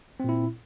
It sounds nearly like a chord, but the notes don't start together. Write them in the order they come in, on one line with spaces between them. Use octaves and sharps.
C4 A#2 E4